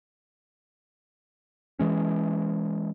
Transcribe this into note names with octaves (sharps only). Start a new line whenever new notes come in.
E3 G#3 C#4